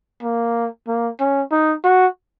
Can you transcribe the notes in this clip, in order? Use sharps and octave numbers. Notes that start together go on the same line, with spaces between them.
A#3
A#3
C#4
D#4
F#4